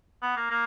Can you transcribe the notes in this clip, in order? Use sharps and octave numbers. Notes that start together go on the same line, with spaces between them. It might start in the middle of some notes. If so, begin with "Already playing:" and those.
B3
A#3
A#3